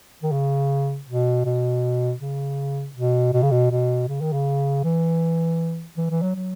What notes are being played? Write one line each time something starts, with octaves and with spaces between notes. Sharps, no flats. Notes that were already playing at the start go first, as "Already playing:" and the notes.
D#3
C#3
B2
B2
C#3
B2
B2
C#3
B2
B2
C#3
D#3
C#3
E3
E3
E3
F#3
F#3